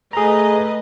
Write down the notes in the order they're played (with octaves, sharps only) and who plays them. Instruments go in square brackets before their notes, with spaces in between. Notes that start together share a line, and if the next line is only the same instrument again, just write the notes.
[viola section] A3 B4 D#5 [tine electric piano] G#4 A#5